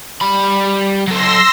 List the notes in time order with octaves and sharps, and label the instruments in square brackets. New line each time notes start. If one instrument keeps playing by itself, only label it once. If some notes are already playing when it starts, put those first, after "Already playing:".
[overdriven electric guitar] G3 B5
[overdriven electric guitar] F#3 A4 [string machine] C6 E6 A#6